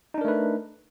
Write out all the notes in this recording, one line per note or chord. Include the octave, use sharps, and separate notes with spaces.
A3 D4 D#4 A#4 B4